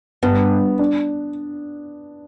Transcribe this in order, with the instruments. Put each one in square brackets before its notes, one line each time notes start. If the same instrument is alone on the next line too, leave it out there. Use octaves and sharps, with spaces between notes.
[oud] G2 [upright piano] B3
[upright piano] D4